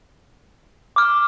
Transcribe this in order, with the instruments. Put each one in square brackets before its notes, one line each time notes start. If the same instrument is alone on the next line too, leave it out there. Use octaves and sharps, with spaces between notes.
[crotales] D6 F6